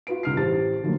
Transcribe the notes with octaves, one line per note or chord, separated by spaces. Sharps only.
F4 F#4 B4 D7
C#2 F6 C7
A1 G4 C5 A5 A6
D3 F3 F#3 A3 A#3